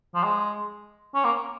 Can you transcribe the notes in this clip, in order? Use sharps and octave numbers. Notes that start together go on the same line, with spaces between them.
F3
G#3
C#4
A#3